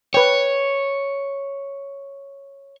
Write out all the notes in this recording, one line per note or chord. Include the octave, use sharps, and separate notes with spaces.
B4 C#5 G5